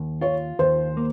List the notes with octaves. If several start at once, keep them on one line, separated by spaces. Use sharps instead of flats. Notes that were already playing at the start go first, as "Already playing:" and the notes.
Already playing: D#2
F4 C#5
D#2 C5
A#3